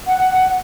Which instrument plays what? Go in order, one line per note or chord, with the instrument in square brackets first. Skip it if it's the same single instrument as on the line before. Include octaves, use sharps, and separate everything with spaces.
[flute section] F#5